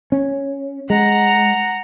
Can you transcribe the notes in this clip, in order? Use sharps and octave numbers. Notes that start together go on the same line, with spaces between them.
C#4
G#3 F#5 A#5